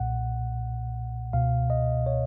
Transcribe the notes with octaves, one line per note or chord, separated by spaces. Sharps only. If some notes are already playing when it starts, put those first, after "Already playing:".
Already playing: B1 A#2 F#5
C#2 B2 F5
D#5
C#5